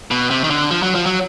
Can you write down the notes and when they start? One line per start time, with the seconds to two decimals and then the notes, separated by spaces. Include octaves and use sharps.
0.11 B2
0.30 C3
0.44 D#3
0.50 D3
0.71 F3
0.83 F#3
0.95 F3
1.06 F#3